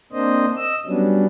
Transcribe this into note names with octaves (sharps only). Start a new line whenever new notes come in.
A#3 C4 D4 C5 D#5
D#5 E6
F#3 G3 B3 C#4 D4